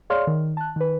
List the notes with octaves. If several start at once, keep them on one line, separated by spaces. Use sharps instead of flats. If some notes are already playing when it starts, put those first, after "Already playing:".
G#4 C#5 D5 F5 C6 F6
D#3
A5 F#6
D#3 B4